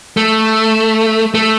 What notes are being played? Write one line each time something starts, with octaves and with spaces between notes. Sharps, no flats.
A3
A3